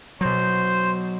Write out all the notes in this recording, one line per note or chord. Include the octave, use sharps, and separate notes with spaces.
B2 F#3 C5